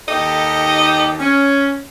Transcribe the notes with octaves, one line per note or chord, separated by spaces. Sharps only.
D#2 D#4 G4 A4 D#5
C#4